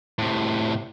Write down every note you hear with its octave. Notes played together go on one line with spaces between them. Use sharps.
A2 C3